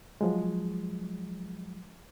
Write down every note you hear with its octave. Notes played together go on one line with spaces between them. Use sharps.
F3 F#3 G#3